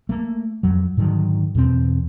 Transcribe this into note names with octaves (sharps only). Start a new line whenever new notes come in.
A3 A#3
F2 F#3
G#2 D3 D#3 F#3
E2 B2 A#3 C4